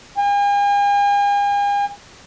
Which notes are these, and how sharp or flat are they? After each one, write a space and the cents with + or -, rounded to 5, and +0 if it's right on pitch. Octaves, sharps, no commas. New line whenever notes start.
G#5 -45